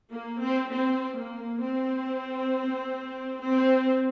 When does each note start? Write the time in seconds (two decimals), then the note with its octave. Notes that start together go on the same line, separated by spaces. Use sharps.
0.10 A#3
0.40 C4
0.70 C4
1.16 A#3
1.61 C4
3.42 C4